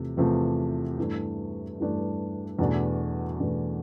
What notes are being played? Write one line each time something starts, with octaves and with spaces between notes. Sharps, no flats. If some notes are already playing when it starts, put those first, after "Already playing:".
Already playing: E2 C3 F3 A3
E2 C3 F3 A3
G2 E3 A3 D4
G2 E3 A3 D4
E2 B2 A3 D4
E2 B2 A3 D4